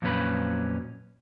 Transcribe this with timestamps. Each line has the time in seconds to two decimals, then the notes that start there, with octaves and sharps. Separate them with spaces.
0.02 F2 A#2 F#3 C#4 B4 B5